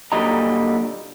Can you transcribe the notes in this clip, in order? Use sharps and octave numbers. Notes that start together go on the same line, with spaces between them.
A#2 D3 F#3 G3 D#5 A#5